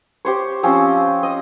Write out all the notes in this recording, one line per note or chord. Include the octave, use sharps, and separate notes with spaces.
G4 C5 C#5
F3 C4 C#4 E6
D#5